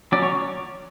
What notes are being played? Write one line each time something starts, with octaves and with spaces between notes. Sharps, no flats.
F#3 C#4 D5
C#5